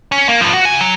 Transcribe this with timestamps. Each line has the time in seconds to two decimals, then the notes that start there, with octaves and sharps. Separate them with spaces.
0.12 C#4
0.29 A#3
0.41 G2 F3
0.54 F#4
0.65 C#3 G#5
0.81 F#3